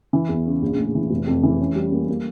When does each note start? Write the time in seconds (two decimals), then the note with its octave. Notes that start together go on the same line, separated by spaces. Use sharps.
0.13 E3
0.29 E2
0.46 C#3
0.62 A#1
0.78 A2
0.95 E3
1.10 F1
1.27 F2
1.43 E3
1.59 C#4
1.76 G3
1.92 A#3
2.08 A#3